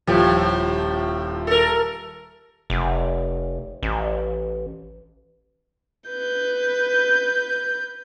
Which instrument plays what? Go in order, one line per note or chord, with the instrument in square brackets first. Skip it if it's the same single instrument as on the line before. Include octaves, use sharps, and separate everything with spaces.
[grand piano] D#1 F3 G4 [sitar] A2
[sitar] A4 A#4
[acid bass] F1
A1
[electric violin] B4 G6